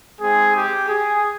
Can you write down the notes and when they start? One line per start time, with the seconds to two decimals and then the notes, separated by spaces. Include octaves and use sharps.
0.19 G#3 C4 D#4 G#4
0.54 G4
0.87 G#4